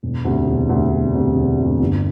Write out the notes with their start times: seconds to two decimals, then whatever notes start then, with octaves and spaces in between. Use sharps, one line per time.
0.03 E1
0.25 D2 C3
0.47 E1
0.69 D2 C3
0.92 E1
1.14 D2 C3
1.36 E1
1.58 D2 C3
1.80 G1